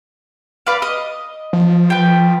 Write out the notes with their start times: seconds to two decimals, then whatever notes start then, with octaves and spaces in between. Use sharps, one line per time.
0.67 B4 D5 F5
0.82 D#5 D#6
1.53 F3
1.90 B4 G5